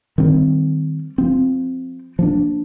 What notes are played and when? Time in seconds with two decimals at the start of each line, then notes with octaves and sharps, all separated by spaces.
0.18 D#3 G3 C4
1.18 F3 C4
2.19 F3 A#3 D4